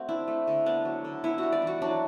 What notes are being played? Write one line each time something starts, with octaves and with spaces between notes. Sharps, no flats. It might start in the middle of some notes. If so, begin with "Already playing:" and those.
Already playing: A3 C4 F#4
D4 E4
A3
D3
B3 D4
F#3
D3
B3 E4
F#4
G3
D5
E3
F#4
F#3 D4